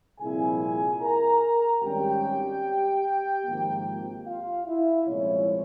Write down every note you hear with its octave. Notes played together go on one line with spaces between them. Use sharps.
C2 A#2 F3 C4 E4 G#4 G#5
A#4 A#5
G#1 G#2 G3 C#4 G4 G5
G#1 G#2 F3 A#3
F4 F5
E4 E5
C2 A#2 F3 G#3 C#4 C#5